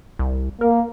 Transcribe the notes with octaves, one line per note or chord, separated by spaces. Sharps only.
C2
A#3 A#4